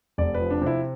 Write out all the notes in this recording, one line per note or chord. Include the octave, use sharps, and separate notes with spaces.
F1 D5
B4
F3
D4
C3
E4